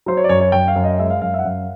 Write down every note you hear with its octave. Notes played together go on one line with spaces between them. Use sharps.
F#3 C5
C#5
D5
F#2 C#5
C#5
F#2 G5
F5
F#2
D#5
G#3 E5
F5
F#2 F5
E5
F#5
F#2 F5